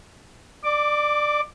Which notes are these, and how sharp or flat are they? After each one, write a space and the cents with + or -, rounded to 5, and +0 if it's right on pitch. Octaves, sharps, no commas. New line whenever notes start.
D5 +20 D6 -5